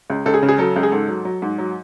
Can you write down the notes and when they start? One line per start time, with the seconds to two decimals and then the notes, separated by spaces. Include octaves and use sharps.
0.10 C#2
0.26 C#2 A4
0.34 G#4
0.43 C#3
0.49 G#4
0.58 F#3 A4
0.76 C#2
0.83 G#4
0.92 G#2 A4
1.08 F#3
1.25 F#3
1.42 G#2
1.58 F#3